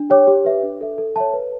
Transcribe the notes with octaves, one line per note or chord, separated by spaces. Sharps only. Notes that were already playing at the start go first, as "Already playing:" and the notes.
Already playing: D4
G4 C#5 G5 D6
G4
B4 E5
D4
A4 E5
A4
C#5 E5 A5
B4